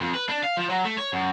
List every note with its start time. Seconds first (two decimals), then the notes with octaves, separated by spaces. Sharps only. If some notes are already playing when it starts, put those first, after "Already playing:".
0.01 F2
0.14 B4
0.29 D4
0.43 F5
0.57 F3
0.70 F#3
0.85 A3
0.98 C#5
1.13 F#2